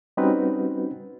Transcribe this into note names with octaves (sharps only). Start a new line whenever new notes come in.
G3 C4 C#4 D#4 F#4 B4